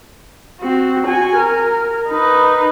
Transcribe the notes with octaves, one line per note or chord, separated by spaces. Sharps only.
C4 F#4
F#4 G#5
A#4
D#4 B4